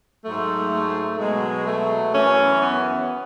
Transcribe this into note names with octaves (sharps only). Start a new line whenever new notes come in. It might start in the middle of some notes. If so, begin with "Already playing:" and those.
G#2 F#3 A3
A3
B2 F#3 G#3
A3
F#2 E3 C#4
B3